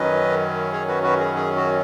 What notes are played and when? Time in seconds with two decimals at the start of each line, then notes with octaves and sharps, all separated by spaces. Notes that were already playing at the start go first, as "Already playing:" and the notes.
Already playing: F#2 D#3 F#3 C#4 B4 D#5
0.72 G#4 C#5
0.88 F#4 B4
1.03 F#4 B4
1.19 G#4
1.35 G#4
1.56 F#4